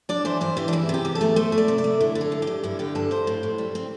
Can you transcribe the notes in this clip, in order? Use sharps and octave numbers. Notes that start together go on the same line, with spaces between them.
D4 D5
E3 C5
G2 C5
E3 G4
D4
E2 E4
C3 G4
E2
A4
A3
A3 C5
A3
D5
C3
D5
A3
D3 E4
D3
A4
G2
G4
G2
G2 E4
D3 G4
G2 A4
G2 C5
A2
A2
G3
C4